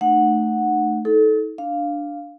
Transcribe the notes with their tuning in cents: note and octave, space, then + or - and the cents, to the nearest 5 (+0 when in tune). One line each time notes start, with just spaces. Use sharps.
A3 +0 D#4 -40 F#5 -10
D#4 +40 A4 -15
D4 +0 F5 +0